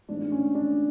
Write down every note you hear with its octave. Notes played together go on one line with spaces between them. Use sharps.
A1 G#2 G#3 D4
C#4
D4